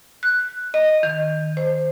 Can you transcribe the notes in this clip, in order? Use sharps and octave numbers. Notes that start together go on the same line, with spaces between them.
F#6
D#5
D#3
C5